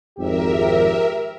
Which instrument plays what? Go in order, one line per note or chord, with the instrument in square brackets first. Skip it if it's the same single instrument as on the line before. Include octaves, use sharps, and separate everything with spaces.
[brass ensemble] G#1 F2 [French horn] G4 [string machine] A#4 E5